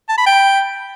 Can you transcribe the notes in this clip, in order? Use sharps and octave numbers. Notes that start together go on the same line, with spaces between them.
A5
B5
G5